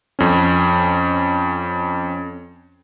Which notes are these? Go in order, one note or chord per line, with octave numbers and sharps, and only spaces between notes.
F2 C#4